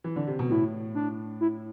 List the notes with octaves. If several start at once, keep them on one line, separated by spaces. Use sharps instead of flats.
E3
D3
C3
B2
A2 E4
D4
E4